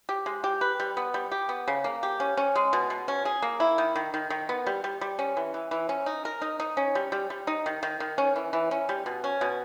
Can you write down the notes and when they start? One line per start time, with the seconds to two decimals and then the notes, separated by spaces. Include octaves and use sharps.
0.09 G4
0.26 G#3
0.44 G4
0.61 B4
0.80 G3
0.97 B3
1.14 G3
1.32 G4
1.49 B3
1.68 C#3
1.84 A#3
2.03 G4
2.20 C#4
2.37 C#4
2.56 G#3
2.73 B2
2.90 B2
3.08 C#4
3.25 G#4
3.42 A#3
3.60 E4
3.78 D#3
3.95 D#3
4.14 D#3
4.30 D#3
4.49 B3
4.67 G3
4.84 G3
5.01 G3
5.19 C#4
5.37 E3
5.54 E3
5.71 E3
5.89 C#4
6.06 D#4
6.25 A#4
6.42 D#4
6.60 D#4
6.77 C#4
6.95 G3
7.12 G3
7.30 G3
7.47 D#4
7.66 D#3
7.83 D#3
8.00 D#3
8.18 C#4
8.36 E3
8.53 E3
8.71 C#4
8.89 G3
9.06 B2
9.24 C#4
9.41 B2